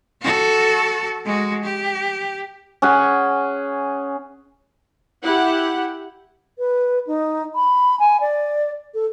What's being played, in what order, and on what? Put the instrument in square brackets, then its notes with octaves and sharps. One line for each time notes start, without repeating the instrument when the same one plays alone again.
[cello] F#4 A4
G#3 F#4
G4
[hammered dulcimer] C#4 G#4 F#5 G#5
[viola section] E4 G4 F#5
[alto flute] B4
D#4
B5
G#5
D5
A4